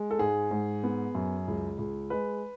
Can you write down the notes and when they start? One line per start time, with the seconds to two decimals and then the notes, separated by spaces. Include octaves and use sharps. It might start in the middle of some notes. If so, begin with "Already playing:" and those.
Already playing: G#3
0.11 A4
0.19 G#2 G#4
0.51 G#2
0.84 B3
1.15 F#2
1.48 C#2
1.79 C#2
2.10 G#3 B4